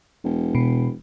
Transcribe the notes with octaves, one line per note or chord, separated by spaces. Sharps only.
E1
B2